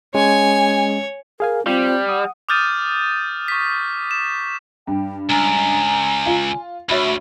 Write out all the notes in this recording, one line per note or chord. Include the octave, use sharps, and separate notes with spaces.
G#3 C#4 C#5 G#5
G#4 A#4 F5 G#5
G3 C4 F4
F#5 D#6
D6 D#6 F6 G6 A6 D#7
C#6 B6
E7
G2 G5
C#2 G#5 A#5
F4
D2 F#4 C#5 E5 B5